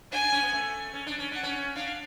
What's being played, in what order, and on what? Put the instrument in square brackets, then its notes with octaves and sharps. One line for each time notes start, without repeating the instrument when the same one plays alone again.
[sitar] D4 [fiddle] G#5
[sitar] D4
C#4
B3
A3
C#4
D4
C#4
[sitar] D4 [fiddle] F#5
[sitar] C#4
[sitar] D4 [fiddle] F5